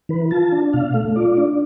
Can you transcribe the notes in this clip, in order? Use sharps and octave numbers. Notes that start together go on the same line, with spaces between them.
E3 B4
F4 A5
D4
B2 F5
A3
F4 D5
D4